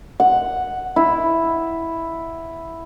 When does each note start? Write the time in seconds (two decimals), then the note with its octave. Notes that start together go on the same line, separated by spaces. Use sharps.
0.20 F#5
0.96 E4